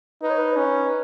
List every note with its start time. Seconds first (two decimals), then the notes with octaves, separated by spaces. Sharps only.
0.22 D#4 B4
0.30 C#5
0.38 B4
0.56 C#4